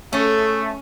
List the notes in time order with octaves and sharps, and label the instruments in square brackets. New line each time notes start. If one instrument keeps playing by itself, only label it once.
[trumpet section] A3 [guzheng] C#4 [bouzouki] G#4 A4